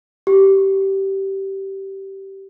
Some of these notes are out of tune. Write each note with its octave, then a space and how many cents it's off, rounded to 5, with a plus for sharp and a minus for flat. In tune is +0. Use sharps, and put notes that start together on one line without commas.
G4 -15